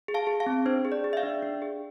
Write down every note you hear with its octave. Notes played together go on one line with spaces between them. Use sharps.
G#4
F5 A5
G#4
F5 A5
C4
D4 C5
G#4
D5
G#4
E5
D5 F5
D4
D4
G#4